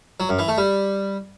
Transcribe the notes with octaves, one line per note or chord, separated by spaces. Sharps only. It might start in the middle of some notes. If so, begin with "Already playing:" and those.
F#3
F#2
E3
A3
G3